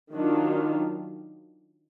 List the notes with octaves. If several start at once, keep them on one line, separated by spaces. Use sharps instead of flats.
D#3 F#3 D4 F4